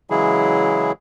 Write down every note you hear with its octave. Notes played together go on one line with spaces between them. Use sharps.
C#3 E3 F#3 G#3 E4 G#4